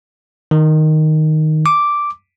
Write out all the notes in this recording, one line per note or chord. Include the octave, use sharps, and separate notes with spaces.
D#3
D6